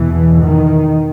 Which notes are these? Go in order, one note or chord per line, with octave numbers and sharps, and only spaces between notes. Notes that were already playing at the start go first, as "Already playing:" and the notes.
Already playing: E2 B2 E3
D#3